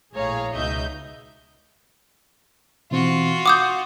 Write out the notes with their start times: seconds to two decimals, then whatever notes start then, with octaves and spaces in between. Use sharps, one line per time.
0.14 A#1 A2 G#4 C#5 F5 A#5
0.54 C#2 B2 D#4 D#5 E5 G6
2.91 B2 E3 C4 F4 F#4
3.46 F#5 D6 D#6 G6